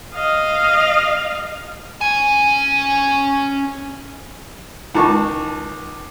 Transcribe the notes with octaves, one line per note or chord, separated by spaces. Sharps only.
D#5 F5
C#4 G#5
C#2 D#3 A5 C#6